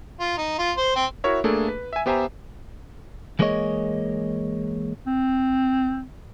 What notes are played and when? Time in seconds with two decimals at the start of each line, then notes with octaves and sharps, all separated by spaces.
0.20 F4
0.38 D#4
0.58 F4
0.77 C5
0.96 C4
1.24 E4 F#4 A#4 C#5 E5
1.44 A3 A#3 D4 G#4 A4
1.68 B4
1.93 E5 G#5
2.06 B3 G4 C5 E5 G#5 A#5
3.39 E3 G#3 A#3 G#4 C#5 D#5
5.07 C4